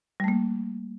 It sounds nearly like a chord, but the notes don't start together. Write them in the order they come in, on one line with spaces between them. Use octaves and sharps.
G3 A3 A#3